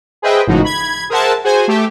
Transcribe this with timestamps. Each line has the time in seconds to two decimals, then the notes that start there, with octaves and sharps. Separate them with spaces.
0.22 G#4 B4 C5 D#5 E5 G5
0.47 G#1 A2 C#3 F3 D#4 F#4
0.64 B5 G#6
1.09 G#4 A#4 C5 E5 F#5 A5
1.44 F#4 G#4 C5 G#5
1.68 A3 G4 E5